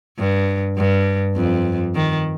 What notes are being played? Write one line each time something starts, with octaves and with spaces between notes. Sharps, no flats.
G2
G2
F2
D#3